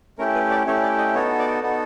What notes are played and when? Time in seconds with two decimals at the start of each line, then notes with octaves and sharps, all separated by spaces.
0.18 A3 C#4 E4 G4 A#4
0.34 B4
0.51 D5
0.66 A3 C#4 E4 G4 C#5
0.83 D5
0.98 D#5
1.15 B3 D#4 F#4 A4 C#5
1.39 D5
1.63 B3 D#4 F#4 A4